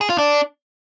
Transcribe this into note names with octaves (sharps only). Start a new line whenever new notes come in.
G#4
F4
D4